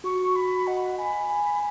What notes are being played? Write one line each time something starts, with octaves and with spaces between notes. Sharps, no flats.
F#4 C#6
F#4 B5
D#5 F#5
G#5 B5
G#5